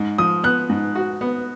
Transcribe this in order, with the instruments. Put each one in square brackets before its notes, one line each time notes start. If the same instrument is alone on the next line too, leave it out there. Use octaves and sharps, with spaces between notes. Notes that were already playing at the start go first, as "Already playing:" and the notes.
Already playing: [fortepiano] G#2
[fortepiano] F3 [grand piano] D#6
[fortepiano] B3 [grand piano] F#6
[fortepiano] G#2
F#4
B3